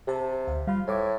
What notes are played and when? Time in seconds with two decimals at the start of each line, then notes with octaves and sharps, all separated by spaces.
0.07 C3 G4 A5
0.47 D2 F5
0.67 G3 F4 B5
0.87 A2 C5 D6 G#6